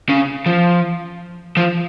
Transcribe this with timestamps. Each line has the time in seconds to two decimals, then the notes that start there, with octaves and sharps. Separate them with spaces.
0.09 C#3
0.46 F3
1.57 F3